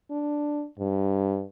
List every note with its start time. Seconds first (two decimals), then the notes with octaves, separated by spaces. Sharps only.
0.11 D4
0.79 G2